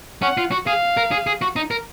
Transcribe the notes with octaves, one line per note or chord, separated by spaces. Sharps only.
C#4 F#5
F4
F#4
G#4 F5
A#4
G#4
G#4
F#4
D#4
A#4